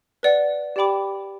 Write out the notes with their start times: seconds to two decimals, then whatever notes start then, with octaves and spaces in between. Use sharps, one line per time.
0.23 B4 D5 F#5
0.76 G4 D5 G5 B5 D6